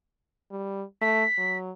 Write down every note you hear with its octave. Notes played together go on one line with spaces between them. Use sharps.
G3
A3 B6
F#3